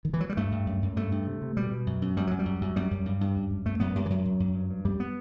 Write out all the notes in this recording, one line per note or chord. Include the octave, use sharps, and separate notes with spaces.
D#3
E3
F#3
G3
G2 A3
G2
F#2
F#2
G2 A3
G2
C3
C3
B2 G3
B2
F#2
F#2
F#2 G3
F#2 F#3
G3
F#2
F#2
F#2 G3
F#2
G2
G2
F#2
F#2
F#2 A3
F#2 B3
F#2 G3
E3
F#2 F#3
F#2
F#2
G2
G2
F#2 G3
B3